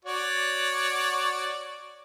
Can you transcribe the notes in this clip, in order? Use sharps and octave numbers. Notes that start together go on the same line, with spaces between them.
F#4 C#5 D5